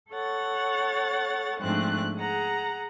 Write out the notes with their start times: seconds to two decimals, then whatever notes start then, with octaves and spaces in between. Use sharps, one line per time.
0.12 A4 C#5 F#5 A6
1.59 G#2 F3 A3 C4 D4 F#6
2.16 G#4 F#5 A#5